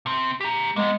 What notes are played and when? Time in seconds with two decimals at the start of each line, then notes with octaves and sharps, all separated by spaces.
0.06 C3 C4
0.41 G4 A#5
0.76 G#3 A#3 B3